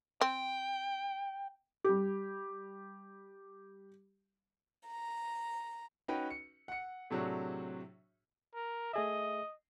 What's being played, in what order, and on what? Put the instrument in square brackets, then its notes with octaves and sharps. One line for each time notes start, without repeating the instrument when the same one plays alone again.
[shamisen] C4 [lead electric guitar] G5
[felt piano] G3 G4
[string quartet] A#5
[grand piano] C#4 D#4 F#4 B4 G5
C#7
F#5 C#7
A2 C3 F#3 D4 F#4 G#4
[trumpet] A#4
[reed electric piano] A3 G#4 E5 [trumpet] D#5